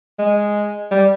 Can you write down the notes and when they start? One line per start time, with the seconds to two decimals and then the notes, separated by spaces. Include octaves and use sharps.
0.19 G#3
0.91 G3